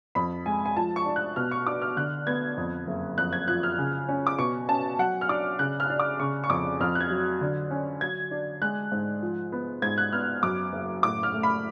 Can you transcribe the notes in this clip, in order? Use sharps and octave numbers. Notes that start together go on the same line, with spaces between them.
F2 B5
G#3 G#5
G#5
F3 A5
C#6
D4
F#6
B2 F6
C#6
D4 D6
F6
D3 F#6
B3 G#6
F2
F#1
F2 F#6
G#6
F3 F#6
F6
C#3
C#4
D6
B2 C#6
C#4 A5
F#3 F#5
F6
D4 D6
C#3 F#6
F6
D4
D6
C#3 C#6
C#6
F2 D6
F2 F6
F#6
G#6
F#3
D3
C#4
F#3 G#6
D4
G#3 F#6
G#2
F3
B3
G#2 G#6
F#6
B3 F6
F#2 D6
F#1
A2 D6
F6
A3
B5